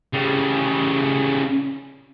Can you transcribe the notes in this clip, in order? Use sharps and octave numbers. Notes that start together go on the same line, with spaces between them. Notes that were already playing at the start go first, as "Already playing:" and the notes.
C#3 G3